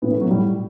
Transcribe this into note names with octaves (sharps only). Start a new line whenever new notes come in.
A2 E3 B3
A3
F#3
A2 E3 G3